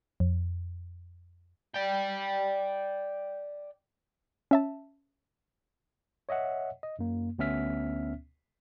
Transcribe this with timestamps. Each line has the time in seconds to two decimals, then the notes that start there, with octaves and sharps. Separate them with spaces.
0.20 F2
1.74 D5 G5
4.51 C#4 E5 A5
6.29 C#5 D#5 E5 F#5
6.83 D#5
6.99 F#2 A#3
7.39 D2 B3 C#4 E5 F6 B6